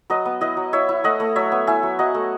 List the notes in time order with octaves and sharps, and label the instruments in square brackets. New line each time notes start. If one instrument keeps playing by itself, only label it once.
[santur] F#3 B4 D#5
B3
E4 B4 D#5
F#3
E4 C#5 E5
E4
A3 D#5 F#5
A3
F#3 C#5 E5
B3
E4 E5 G#5
F#3
F#3 D#5 F#5
A3